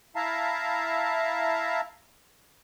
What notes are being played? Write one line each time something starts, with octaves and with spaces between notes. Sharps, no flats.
E4 E5 F5 A5 A#5